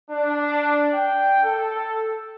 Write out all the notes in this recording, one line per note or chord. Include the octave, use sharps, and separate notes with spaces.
D4
G5
A4